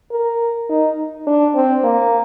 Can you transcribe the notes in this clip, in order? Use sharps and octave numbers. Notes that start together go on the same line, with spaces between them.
A#4
D#4
D4
C4
A#3